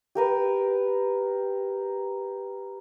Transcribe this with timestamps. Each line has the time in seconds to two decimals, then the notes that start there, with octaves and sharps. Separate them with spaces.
0.15 G4 A#4 B4